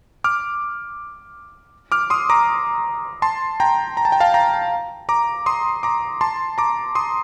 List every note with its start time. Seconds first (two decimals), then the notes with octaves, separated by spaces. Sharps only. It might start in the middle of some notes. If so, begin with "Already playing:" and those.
0.24 D6 F6
1.92 D6 F6
2.10 C6 D#6
2.30 A#5 D6
3.22 A5 C6
3.60 G5 A#5
3.97 A#5
4.05 A5
4.12 G5
4.20 F5 A5
4.34 G5 A#5
5.09 A#5 D6
5.46 C6 D#6
5.83 A#5 D6
6.21 A5 C6
6.58 A#5 D6
6.95 C6 D#6